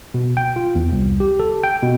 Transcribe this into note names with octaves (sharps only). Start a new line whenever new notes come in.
B2
G5
F4
E2
C2
G4
A4
G5
B2